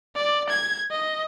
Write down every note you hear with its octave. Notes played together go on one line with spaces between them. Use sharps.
D5
G#6
D#5